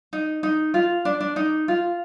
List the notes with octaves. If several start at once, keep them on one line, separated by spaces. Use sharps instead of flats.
D#4
D#4
F4
D4
D4
D#4
F4